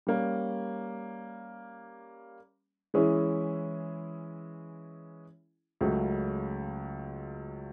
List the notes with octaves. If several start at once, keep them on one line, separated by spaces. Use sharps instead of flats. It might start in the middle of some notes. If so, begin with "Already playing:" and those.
G3 A#3 C#4
E3 G#3 C#4 E4 G#4
C#2 C#3 F#3 A3